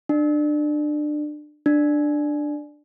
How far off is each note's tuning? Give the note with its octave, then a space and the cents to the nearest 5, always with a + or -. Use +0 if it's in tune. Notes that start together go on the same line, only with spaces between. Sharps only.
D4 +25
D4 +10